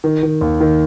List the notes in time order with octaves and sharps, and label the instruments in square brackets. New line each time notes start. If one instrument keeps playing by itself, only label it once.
[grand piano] D#3
D#3
D#2
D#3